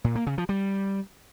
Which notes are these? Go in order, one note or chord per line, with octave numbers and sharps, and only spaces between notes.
A#2
A#3
C#3
F3
G3